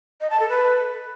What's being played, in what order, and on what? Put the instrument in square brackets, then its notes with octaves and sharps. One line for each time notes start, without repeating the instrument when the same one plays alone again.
[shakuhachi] D#5
A5
A4
B4